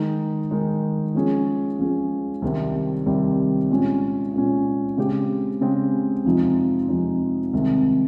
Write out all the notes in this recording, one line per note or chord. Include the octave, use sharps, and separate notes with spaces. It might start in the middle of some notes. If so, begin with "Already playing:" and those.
Already playing: D#3 G#3 D#4
D#3 G#3 D#4
F3 G#3 C#4 G#4
F3 G#3 C#4 G#4
C2 C3 D#3 G3 C4
C2 C3 D#3 G3 C4
A#2 G#3 C#4
A#2 G#3 C#4
C#3 G#3 C4 G4
C#3 G#3 C4 G4
F2 C3 F3 G#3 D#4
F2 C3 F3 G#3 D#4
C2 C3 D#3 G#3